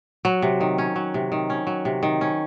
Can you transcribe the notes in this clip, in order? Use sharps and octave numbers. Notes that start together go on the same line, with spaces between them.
F#3
C3
D#3
C#4
F#3
C3
D#3
C#4
F#3
C3
D#3
C#4